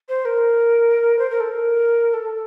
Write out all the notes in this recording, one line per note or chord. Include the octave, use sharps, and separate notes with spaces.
C5
A#4
C5
A#4
A4
A#4
A4